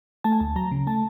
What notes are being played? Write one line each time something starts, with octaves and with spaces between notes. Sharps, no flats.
A3 A5
G#5
D2 A5
F#3 A#5
C#3
A3 A5